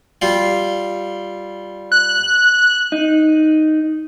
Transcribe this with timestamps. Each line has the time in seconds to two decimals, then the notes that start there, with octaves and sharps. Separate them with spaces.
0.22 G3 F4
1.92 F#6
2.92 D#4